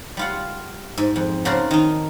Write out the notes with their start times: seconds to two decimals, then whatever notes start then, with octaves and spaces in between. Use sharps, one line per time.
0.17 G3 F4 F#5
0.98 G#2
1.16 F2
1.45 C#3 F#4 A#4 C5 D5 A5
1.71 D#3 D#4